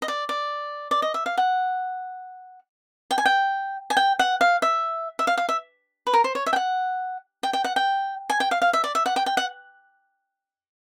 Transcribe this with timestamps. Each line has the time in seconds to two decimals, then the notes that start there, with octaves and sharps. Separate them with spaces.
0.02 D#5
0.08 D5
0.29 D5
0.91 D5
1.02 D#5
1.14 E5
1.26 F5
1.38 F#5
3.11 G5
3.18 G#5
3.25 G5
3.90 G#5
3.97 G5
4.19 F#5
4.41 F5
4.62 E5
5.19 E5
5.27 F5
5.37 F5
5.49 E5
6.07 B4
6.13 A#4
6.24 C5
6.35 C#5
6.46 E5
6.53 G5
6.56 F#5
7.43 G5
7.53 G5
7.64 F#5
7.76 G5
8.30 G#5
8.40 G5
8.51 F5
8.62 F5
8.73 E5
8.84 D5
8.95 E5
9.06 F#5
9.16 G5
9.26 G5
9.37 F#5